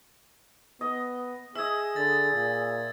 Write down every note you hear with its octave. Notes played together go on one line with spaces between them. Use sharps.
B3 D#5
G#4 D#5 E5 E6 G#6
D3 A6
A#2